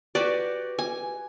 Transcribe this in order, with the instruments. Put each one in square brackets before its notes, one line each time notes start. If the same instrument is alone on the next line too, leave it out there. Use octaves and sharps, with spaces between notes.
[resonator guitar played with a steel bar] F#4 G4 B4 [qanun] D5
[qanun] G#5